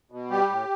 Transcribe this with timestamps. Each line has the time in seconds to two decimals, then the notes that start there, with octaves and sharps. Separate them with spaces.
0.12 B2
0.30 G3 G4
0.49 A2